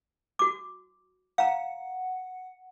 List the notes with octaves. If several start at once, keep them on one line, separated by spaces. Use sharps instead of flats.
F#4 D6
F5 F#5 A#5